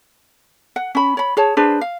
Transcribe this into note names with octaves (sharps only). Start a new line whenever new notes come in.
F#5
C#4 B5
C#5 B5
G#4 C#5 A5
D4 G#4 B4 C5
F5